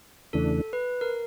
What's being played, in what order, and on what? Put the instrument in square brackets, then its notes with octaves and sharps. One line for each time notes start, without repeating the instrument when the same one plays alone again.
[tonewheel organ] E2 C#3 E3 A3 D4 [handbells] A4
[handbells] B4
A#4